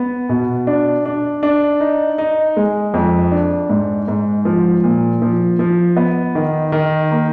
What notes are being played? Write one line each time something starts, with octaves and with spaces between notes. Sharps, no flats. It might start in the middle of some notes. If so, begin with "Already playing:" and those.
Already playing: B3
B2
D4
D4
D4
D#4
D#4
G#3
F2
D4
G#2
G#2
F3
A#2
F3
F3
B3
D#3
D#3
A#3